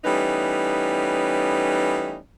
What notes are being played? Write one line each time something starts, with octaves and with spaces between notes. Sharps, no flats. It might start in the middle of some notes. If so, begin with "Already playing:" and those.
E3 G3 A3 B3 C#4 D#4